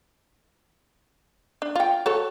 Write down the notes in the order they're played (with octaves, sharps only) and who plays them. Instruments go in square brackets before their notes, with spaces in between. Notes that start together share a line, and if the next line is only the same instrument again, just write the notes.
[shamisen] D4
F4 G5
F#4 A4 C#5